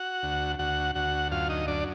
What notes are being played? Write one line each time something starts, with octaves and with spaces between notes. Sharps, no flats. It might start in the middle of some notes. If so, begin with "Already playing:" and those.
Already playing: F#4 F#5
D2
D2 F#4 F#5
D2 F#4 F#5
F#2 F4 F5
D#4 D#5
F#2 D4 D5